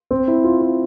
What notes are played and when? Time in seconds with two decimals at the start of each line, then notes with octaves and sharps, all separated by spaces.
0.11 C4
0.28 E4
0.44 F4
0.61 F4